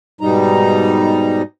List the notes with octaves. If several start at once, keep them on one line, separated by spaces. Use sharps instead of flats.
G#2 B2 G3 D#4 A#5